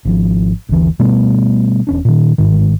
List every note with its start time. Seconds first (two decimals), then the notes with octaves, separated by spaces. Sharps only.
0.05 G#1 F3
0.69 F#1 D2 E3
0.99 B2 G3 A3 B3
1.87 E1 C#4 D4
2.05 A#2 D#3
2.38 G1 C#2 G#2 D#3